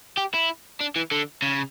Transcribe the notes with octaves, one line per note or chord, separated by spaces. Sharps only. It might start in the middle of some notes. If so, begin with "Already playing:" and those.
G4
E4
D4
E3
D3
C#3